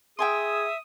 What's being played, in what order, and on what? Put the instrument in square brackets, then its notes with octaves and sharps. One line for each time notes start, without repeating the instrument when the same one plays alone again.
[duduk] G#4 [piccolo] E5 [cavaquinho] G5 G#5 C6 [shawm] D#6